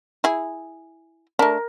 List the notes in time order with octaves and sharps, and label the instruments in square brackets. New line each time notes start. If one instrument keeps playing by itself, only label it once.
[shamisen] E4 G#4
[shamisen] A3 D4 [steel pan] A#4